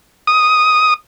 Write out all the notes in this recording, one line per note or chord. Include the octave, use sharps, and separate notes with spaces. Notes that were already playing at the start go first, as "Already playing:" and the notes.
D#6